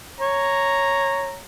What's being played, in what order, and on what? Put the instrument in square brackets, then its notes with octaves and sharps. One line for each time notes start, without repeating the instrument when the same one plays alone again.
[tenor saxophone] C#5 [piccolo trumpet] A#5